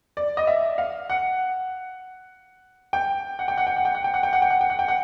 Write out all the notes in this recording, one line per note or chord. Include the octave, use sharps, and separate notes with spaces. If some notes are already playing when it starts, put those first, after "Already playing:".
D5
D#5
E5
F5
F#5
G5
F#5
G5
F#5
G5
F#5
G5
F#5
G5
F#5
G5
F#5
G5
F#5
G5
F#5
G5
F#5